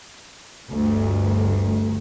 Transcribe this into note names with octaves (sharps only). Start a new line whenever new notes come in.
G1 D2